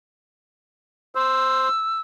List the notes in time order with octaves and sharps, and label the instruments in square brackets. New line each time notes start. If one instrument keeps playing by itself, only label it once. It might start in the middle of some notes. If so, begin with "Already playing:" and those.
[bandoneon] C5 [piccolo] E6